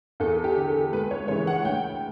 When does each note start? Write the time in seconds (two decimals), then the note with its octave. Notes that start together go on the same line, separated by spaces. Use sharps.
0.20 E2 A4
0.44 G4
0.56 D3
0.68 A4
0.92 C#2 B4
1.11 C#5
1.28 C#3 E3 C#5
1.47 F#5
1.65 D2 G5